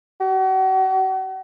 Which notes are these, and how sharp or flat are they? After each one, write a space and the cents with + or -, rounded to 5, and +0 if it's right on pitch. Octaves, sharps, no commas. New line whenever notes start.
F#4 +40